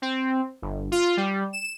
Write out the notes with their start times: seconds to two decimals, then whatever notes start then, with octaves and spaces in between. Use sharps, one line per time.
0.02 C4
0.62 G1
0.92 F4
1.17 G3
1.53 E7